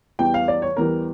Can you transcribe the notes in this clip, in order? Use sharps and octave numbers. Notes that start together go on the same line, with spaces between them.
E2 E3 G3 G5
F5
D5
C#5
E2 E3 G3 A#4